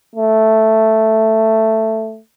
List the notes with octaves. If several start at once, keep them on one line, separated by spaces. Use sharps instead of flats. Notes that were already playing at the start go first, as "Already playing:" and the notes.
A3